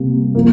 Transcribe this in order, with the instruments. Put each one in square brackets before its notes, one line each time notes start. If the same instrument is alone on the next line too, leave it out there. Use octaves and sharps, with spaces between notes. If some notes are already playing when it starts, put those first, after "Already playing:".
Already playing: [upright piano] C3 G3 A#3
F3 A#3